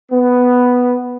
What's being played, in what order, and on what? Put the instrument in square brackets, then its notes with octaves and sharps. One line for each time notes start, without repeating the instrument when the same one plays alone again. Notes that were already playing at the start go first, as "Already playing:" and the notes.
[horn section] B3